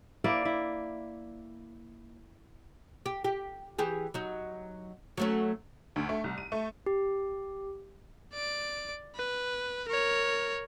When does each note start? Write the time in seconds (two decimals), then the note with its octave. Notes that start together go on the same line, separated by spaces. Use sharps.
0.24 A#3 E4 D5
0.45 E4
3.06 G4
3.24 G4
3.78 E3 G4 G#4
4.14 F#3 D#4
5.17 F#3 A3 C#4
5.96 D2
6.09 A3
6.24 C2
6.38 D#7
6.52 A3
6.86 G4
8.34 D5 D7
9.15 B4
9.88 A#4 C#5